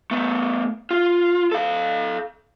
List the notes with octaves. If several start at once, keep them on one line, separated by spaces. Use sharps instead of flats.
A3 B3
F4
A4 F5